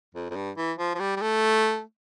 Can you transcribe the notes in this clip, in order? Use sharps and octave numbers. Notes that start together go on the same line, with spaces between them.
F2
F2
G2
E3
F3
F3
G3
G3
A3